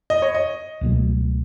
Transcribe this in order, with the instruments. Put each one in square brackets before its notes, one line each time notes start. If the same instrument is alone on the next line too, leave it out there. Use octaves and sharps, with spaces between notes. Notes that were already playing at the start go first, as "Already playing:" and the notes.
[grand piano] D#5
C#5
D#5
[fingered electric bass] C#2 B2 F#3 A3